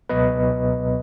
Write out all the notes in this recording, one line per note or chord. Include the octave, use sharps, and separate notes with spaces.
C#2 B2 F#3 B3 B4 D#5